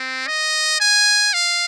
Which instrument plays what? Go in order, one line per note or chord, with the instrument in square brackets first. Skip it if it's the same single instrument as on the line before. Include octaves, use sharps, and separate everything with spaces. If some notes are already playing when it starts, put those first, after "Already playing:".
Already playing: [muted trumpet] C4
D#5
G#5
F5